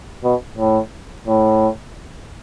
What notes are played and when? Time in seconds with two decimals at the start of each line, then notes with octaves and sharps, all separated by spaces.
0.24 B2
0.58 A2
1.27 A2